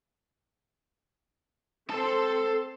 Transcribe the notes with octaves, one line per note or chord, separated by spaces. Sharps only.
C4 A4 A5 C6